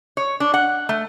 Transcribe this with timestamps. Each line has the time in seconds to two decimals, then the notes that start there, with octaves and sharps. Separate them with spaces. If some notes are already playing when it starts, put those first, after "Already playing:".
0.17 C#5
0.40 D4
0.54 F#5
0.89 A3